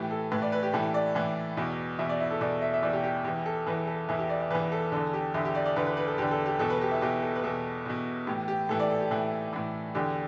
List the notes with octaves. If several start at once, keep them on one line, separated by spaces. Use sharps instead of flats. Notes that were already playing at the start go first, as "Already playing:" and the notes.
Already playing: A2 E3 G4
A4
A2 E3 B4
D5
B4
G4
A2 E3 A4
D5
A2 E3
E2 B2
E2 B2 E5
D5
E4
A4
E2 B2 D5
E5
E5
E2 B2 D5
G4
G4
E2 E3 G4
A4
E2 E3 B4
A4
E2 E3 E4
G4
D5
D5
E2 E3 B4
A4
E2 D3 A4
G4
E2 D3 E4
G4
D5
D5
E2 D3 B4
B4
B4
A4
E2 D3 G4
A4
G4
E2 B2 A4
B4
G4
E4
E2 B2 G4
A4
B4
E2 B2 A4
E2 B2
A2 E3 G4
G4
A2 E3 A4
D5
A4
G4
A2 E3
A2 E3
E2 D3 G4